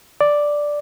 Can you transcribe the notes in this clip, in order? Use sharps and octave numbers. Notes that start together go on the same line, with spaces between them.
D5